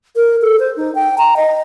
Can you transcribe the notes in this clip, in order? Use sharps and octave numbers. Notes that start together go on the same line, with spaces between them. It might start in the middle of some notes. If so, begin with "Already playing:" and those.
A#4
A4
C5
D#4
G5
A#5
D#5